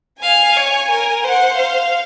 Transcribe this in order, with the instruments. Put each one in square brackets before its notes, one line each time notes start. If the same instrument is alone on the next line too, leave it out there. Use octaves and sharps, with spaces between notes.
[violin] F5 [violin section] G#5
[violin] C#5
A#4
[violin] C5 [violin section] F#5
[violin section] F5